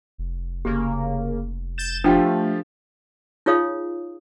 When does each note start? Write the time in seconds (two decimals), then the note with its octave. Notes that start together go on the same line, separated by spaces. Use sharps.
0.18 F1
0.65 F1 C#3 A#3 G4
1.78 G6 A6 E7
2.04 F3 A3 D4 F4 G4 G5
3.46 D#4 F4 G#4 C#5 F5 D#6